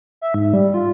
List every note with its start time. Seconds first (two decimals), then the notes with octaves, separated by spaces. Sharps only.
0.22 E5
0.34 G#2
0.53 G3
0.74 F4